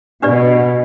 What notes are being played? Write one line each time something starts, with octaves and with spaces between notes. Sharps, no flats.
B2 D4 G4 B4 D5